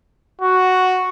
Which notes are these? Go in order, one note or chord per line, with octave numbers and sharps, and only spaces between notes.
F#4